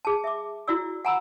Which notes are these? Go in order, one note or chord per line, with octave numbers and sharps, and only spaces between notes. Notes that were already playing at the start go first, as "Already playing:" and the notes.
G#4 A5
E5 D6
E4 F#4 D5 E6
F#5 G#5 A#5 B5 E6